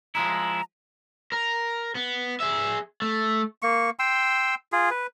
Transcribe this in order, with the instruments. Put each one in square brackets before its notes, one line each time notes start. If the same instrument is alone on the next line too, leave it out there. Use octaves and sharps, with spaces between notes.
[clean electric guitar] F3 G#3 E4 [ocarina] A#5
[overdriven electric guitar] A#4
B3
G#4 E5
A3
[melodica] A#3 C#6
G5 C6 E6
F4 G#4
B4